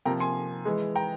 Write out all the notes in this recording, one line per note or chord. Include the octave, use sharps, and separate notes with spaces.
C3 F3 A#3 G5 A#5
G#5 C6
E3 G#3
G5 A#5